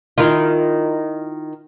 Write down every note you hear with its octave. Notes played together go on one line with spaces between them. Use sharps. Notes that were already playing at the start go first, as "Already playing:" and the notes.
D#3 E4 F4